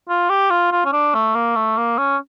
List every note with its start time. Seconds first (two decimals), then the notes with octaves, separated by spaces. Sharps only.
0.09 F4
0.30 G4
0.51 F4
0.72 F4
0.85 C#4
0.93 D4
1.14 A3
1.35 A#3
1.56 A3
1.77 A#3
1.98 C#4